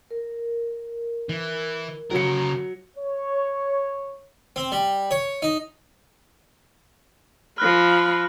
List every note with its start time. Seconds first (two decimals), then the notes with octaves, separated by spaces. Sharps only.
0.11 A#4
1.29 E3
2.11 C#3 F#3 A#4 C#7
2.96 C#5
4.56 C4
4.72 G3
5.11 C#5
5.42 D#4
7.58 F3 B5 F6 F#6 A#6